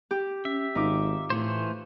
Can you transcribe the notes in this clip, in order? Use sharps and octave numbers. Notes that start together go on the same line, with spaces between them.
G4
C#4 E5
G#1 D#4 F4 D6
A2 E3 A3 C5